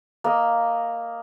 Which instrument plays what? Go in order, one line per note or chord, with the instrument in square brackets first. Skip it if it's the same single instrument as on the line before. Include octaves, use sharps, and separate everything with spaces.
[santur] A#3 D#5